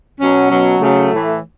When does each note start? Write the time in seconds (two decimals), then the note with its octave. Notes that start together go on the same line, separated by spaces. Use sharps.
0.19 B2 F#3 C#4
0.50 B2 F#3
0.80 C#3 F#3 A3
1.11 A2 E3